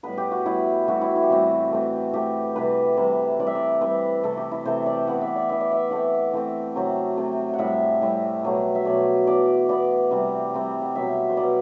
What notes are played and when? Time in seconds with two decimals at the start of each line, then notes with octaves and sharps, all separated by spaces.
0.03 A2 G3 B3 B4
0.18 G4
0.31 F#4
0.45 A2 G3 B3 E4
0.87 A2 E3 G3 C4 F#4
1.01 E4
1.16 E4
1.23 G4
1.29 A2 E3 G3 C4 F#4
1.71 E3 A3 C4
2.13 E3 A3 C4 G4
2.55 C3 E3 G3 B4
2.97 C3 E3 G3 C5
3.39 E3 G3 C4 D5
3.47 E5
3.55 D5
3.81 E3 G3 C4 B4
4.23 C3 E3 A3 A4
4.37 G4
4.51 E4
4.65 C3 E3 A3 C5
4.86 D5
5.07 E3 B3 F#5
5.21 E5
5.36 D5
5.49 E3 B3 E5
5.60 D5
5.72 E5
5.91 E3 A3 C4 F#5
6.33 E3 A3 C4
6.75 C3 F#3 A3 C4
7.17 C3 F#3 A3 C4
7.54 F#5
7.59 A2 G3 C4 E5
8.01 A2 G3 C4
8.43 B2 F#3 A3
8.75 E5
8.85 B2 F#3 A3 D5
9.27 E3 B3 D5
9.69 E3 B3 D5
10.11 C3 G3 C4
10.53 C3 G3 C4
10.82 F#5
10.95 B2 F#3 B3 E5
11.29 C5
11.37 B2 F#3 B3 D5